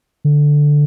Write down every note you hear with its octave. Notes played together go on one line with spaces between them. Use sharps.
D3